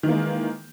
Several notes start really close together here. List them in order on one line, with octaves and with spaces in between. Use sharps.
D#3 E3 A#3 G#3